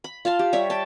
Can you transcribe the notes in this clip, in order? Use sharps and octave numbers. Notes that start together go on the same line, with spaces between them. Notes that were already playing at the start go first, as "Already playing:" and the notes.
B5
F4 F5 A5 C6
G4
G3 C#5 E5
G5 A5